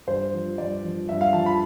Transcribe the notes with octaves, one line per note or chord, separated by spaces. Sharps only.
G2 C5
F3
G2 D5
F3
G2 E5
F5
F3 A5
B5